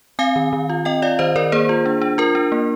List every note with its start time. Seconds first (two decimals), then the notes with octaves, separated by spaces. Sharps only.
0.19 C4 F5 G#5
0.36 D#3
0.53 D#3
0.70 F4
0.85 C4 D#5 G5
1.02 F4 D5 F5
1.19 D#3 C5 D#5
1.36 D#3 A#4 D5
1.52 A#3 G#4 C5
1.69 F4
1.86 D4
2.01 D4
2.18 F4 A#4
2.35 D4
2.52 A#3